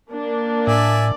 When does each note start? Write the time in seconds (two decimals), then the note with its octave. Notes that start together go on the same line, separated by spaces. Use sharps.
0.11 A#3 D4
0.67 A2 D5 E5 G#5